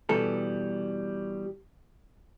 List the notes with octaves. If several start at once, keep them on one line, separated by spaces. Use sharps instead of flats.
B2 E3 G3 A4